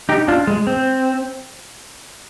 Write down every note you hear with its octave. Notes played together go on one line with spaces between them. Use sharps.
D#4 G4
D4 F4
G#3
C4